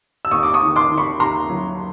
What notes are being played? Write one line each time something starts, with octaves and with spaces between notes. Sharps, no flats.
E6
D#2 C#6 D#6
D6
C#6 D#6
D#3
C6 D6
D#3
B5 C#6
D#2 A#5 C6
F#3